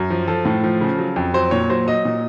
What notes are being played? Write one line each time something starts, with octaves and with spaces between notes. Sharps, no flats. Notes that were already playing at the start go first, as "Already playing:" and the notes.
Already playing: F#2
F3
F3 A4
A2
F3
C#3
F#3
F2
F#3 C5
A#2 C#5
F#3 C5
F#3 D#5
A#2